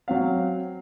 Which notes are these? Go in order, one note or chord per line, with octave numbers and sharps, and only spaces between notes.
F#3 C4 F5